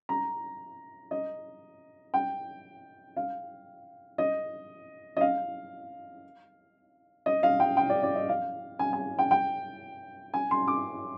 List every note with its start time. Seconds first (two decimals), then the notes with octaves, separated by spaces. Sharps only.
0.09 A#5
1.11 D#5
2.14 G5
3.17 F5
4.18 D#5
5.17 D#5
5.21 F5
7.26 D#5
7.43 F5
7.60 G5
7.77 G5
7.90 D5
8.03 D5
8.16 D#5
8.29 F5
8.79 G#5
8.93 G#5
9.19 G5
9.31 G5
10.34 G#5
10.51 C6
10.68 D6